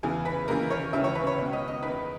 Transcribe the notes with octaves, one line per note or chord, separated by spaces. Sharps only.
E2 C#3 E3 G#4
B4
D#2 C#3 E3 A#4
C#5
C#2 C#3 E3 E5
C#5
B4
C#5
C#2 B2
D#5
D#5
E2 D#3 B4